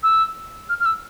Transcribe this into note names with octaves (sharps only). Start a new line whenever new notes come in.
E6
F6
F6
E6